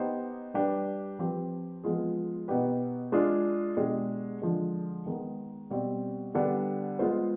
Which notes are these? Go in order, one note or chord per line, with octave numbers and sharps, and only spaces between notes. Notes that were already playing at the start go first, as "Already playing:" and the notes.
Already playing: B3 D#4 G4 C5
G3 D4 G4 B4
F3 C4 G4 B4
F3 G#3 B3 F4 G#4
B2 B3 D#4 G4 B4
G#3 D4 F4 G#4
B2 G#3 D4 G4
D3 F3 G#3
D#3 G#3 B3
B2 G3 C4
D3 G3 B3 D4
G#3 B3 F4 C5